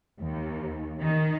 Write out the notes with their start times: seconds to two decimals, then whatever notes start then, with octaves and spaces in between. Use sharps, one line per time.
0.20 D#2
1.01 D#3